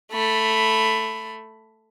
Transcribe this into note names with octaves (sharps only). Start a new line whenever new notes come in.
A3 B5